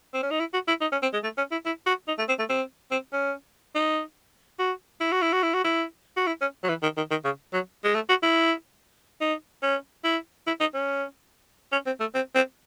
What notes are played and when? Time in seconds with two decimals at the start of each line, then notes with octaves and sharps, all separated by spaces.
0.14 C4
0.23 C#4
0.31 D#4
0.40 E4
0.53 F#4
0.68 E4
0.81 D#4
0.92 C#4
1.03 C4
1.13 G#3
1.24 A3
1.38 C#4
1.51 E4
1.66 E4
1.86 F#4
2.08 D#4
2.19 A3
2.28 C4
2.39 A3
2.49 C4
2.91 C4
3.13 C#4
3.75 D#4
4.59 F#4
5.01 E4
5.12 F#4
5.22 E4
5.32 F#4
5.43 E4
5.54 F#4
5.64 E4
6.17 F#4
6.27 E4
6.41 C#4
6.64 F#3
6.69 E3
6.83 D#3
6.97 D#3
7.11 D#3
7.25 C#3
7.53 F#3
7.84 G#3
7.95 A3
8.09 F#4
8.23 E4
9.21 D#4
9.63 C#4
10.04 E4
10.47 E4
10.60 D#4
10.74 C#4
11.72 C#4
11.86 C4
12.00 A3
12.15 C4
12.35 C4